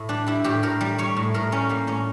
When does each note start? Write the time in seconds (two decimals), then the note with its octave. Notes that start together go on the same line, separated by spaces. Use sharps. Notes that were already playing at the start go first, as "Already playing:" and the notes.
Already playing: A2 E4
0.09 G3 D4
0.26 G3 E4
0.44 A2 G4
0.63 A2 A#4
0.81 G3
0.98 G3 C#5
1.17 A2
1.34 A2 A#4
1.52 G3 C#4
1.69 G3 A#3
1.87 A2 C#4